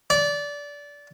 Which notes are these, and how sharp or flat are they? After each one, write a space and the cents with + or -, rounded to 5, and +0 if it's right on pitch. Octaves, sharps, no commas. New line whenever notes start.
D5 -20